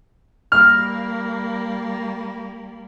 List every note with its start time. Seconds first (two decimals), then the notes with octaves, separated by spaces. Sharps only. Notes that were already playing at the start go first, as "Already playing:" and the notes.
0.52 G3 A#3 F6